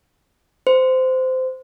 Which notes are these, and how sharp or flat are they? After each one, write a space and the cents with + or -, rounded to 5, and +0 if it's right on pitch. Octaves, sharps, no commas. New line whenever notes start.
C5 -20